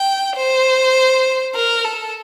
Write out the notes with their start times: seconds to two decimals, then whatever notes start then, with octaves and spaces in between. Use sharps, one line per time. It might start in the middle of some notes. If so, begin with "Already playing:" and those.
Already playing: G5
0.36 C5
1.55 A#4
1.85 A4